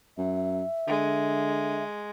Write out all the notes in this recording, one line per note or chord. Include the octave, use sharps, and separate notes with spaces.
F#2 E5
D3 G#3